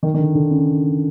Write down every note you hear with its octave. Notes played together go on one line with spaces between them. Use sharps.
D#3
D#3
D3
D3
C#3